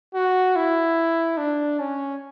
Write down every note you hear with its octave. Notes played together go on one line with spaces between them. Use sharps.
F#4
E4
D4
C#4